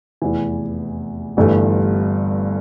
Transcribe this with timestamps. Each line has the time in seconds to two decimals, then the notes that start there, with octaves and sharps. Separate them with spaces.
0.22 F1 E2 E3
1.37 G1 G2 E3 A3